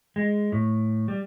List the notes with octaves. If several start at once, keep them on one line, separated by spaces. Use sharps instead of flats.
G#3
A2
G3